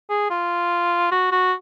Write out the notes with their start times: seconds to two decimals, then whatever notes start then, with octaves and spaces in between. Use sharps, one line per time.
0.09 G#4
0.30 F4
1.12 F#4
1.32 F#4